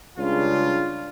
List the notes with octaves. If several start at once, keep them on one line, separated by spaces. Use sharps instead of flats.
C#2 C#3 G3 D4 F4